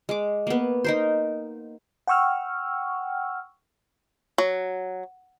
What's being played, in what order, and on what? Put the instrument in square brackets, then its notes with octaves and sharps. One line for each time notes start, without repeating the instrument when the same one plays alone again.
[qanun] G#3 D6
A#3 B3
D#4 A#4 C5
[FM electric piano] F#5 G5 C#6 E6 F6
[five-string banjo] F#3